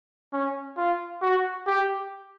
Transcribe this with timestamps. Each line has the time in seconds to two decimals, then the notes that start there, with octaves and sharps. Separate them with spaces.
0.33 C#4
0.77 F4
1.22 F#4
1.67 G4